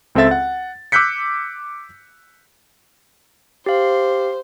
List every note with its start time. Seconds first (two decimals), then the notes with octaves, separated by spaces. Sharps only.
0.15 C#2 C4 A4 E5 A6
0.31 F#5
0.92 D6 E6 F#6 G6 B6 C#7
3.66 G4 C5 F5